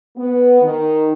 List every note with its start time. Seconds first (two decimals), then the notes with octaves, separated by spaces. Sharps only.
0.16 B3
0.62 D#3